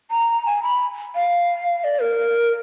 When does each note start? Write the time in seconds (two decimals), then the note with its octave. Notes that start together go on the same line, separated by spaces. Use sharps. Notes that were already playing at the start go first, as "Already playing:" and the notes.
0.11 A#5
0.46 G#5
0.63 B5
1.15 F5
1.84 D5
2.01 A#4